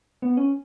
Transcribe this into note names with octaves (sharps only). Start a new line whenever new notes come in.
B3
C#4